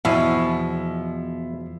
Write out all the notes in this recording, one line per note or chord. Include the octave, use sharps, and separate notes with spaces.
E2 B2 F3 E4 G#5